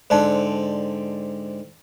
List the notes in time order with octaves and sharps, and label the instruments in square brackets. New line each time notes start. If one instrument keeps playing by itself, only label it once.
[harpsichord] G#2 D3 C4 [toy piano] C5 D5 A5